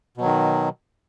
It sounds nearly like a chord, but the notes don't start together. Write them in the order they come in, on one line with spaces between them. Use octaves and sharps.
B2 F#3 D#3